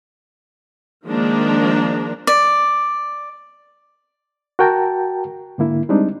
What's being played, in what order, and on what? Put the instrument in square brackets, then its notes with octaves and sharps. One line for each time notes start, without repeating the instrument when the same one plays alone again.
[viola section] D#3 F3 G#3 A#3 D4 A#4
[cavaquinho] D5
[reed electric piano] F#4 A#4 G5 A5 A#5
G#2 D3 A#3 E4
G3 G#3 C4 D4 D#4